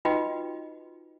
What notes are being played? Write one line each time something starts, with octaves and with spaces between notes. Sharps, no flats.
D#4 F4 F#4 B4 D#5 G5